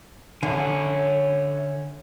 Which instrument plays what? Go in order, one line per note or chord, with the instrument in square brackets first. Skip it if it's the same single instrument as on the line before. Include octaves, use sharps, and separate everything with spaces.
[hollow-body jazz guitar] D3 [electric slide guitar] C#5 E5 G#5